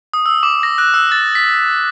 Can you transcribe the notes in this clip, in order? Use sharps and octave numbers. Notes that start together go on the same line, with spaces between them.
D#6
E6
D6
A#6
F#6
E6
A6
B6